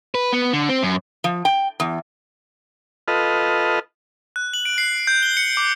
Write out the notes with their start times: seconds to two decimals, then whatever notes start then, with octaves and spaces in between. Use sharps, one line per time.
0.15 B4
0.33 B3
0.53 D3
0.69 C4
0.83 F#2
1.24 F3
1.45 G5
1.80 E2
3.08 F4 A4 B4 D#5
4.36 F#6
4.54 F#7
4.65 D7
4.78 C7
5.07 G6
5.22 G7
5.37 C#7
5.57 D6